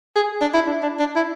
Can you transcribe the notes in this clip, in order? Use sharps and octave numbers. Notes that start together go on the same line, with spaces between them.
G#4
D4
E4
D4
D4
D4
E4